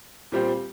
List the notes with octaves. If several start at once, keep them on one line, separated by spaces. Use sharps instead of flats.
A#2 G3 C4 G4 C5